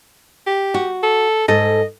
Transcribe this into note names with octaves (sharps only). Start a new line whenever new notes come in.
G4
F#4
A4
G#2 A4 D#5